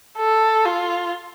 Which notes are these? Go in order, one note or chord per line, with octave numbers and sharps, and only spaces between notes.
A4
F4